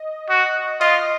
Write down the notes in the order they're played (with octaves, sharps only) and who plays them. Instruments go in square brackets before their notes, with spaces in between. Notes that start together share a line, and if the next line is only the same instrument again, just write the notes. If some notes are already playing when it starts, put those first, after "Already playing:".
Already playing: [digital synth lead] D#5
[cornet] F#4
[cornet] F4 [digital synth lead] D#5